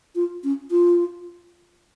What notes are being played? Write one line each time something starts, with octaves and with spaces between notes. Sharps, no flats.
F4
C#4
F4